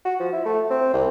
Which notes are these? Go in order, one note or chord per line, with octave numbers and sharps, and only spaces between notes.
F#4
F3
E4
A3
C4
C2